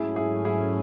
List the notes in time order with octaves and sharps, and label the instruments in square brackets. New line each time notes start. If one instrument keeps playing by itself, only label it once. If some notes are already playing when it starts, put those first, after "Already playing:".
Already playing: [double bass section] G#2 F#3 A3 C#4 [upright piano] E4 G#4
[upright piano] E4 G#4
E4 G#4